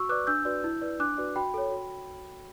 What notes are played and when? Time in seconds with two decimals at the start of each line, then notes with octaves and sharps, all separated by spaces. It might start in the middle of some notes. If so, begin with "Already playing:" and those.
Already playing: F#4 C#6 E6
0.09 B4 D5 D6 F#6
0.27 D4 E6 G6
0.45 F#4 B4 D5
0.64 E4
0.82 B4 D5
0.99 D4 D6 F#6
1.18 F#4 B4 D5
1.36 F#4 G5 B5
1.54 A4 C#5
1.72 F#4